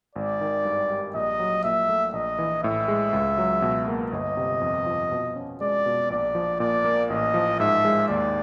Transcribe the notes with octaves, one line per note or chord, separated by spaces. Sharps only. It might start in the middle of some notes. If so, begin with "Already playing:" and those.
G#1 D5
D#3
G2
G3
A#1 D#5
F#3
A#2 E5
A3
A#1 D#5
E3
A2 E5
G#3
C#2
F#3
B2
A#3
G1 D#5
C3
F2
F3
B2
C#4
G#3 D5
B2
A#1 D5
F3
A#2 D5
A#3
A1 D#5
F3
G#2 E5
G#3
D#2 D5